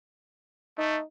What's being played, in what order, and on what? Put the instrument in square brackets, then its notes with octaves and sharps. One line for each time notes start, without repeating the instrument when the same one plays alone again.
[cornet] A3 [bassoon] D#4